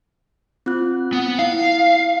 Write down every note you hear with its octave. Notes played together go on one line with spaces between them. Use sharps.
C4 F4 F#6
B3
E4 F5